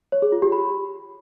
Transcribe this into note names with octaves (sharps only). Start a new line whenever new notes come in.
C#5
G#4
F4
G4
B5